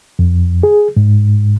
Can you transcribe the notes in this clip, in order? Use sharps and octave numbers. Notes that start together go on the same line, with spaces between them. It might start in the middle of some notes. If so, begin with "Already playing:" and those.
F2
G#4
G#2